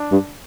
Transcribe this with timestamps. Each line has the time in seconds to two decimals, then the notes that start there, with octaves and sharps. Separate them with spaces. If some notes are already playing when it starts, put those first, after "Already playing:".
Already playing: D4
0.12 G2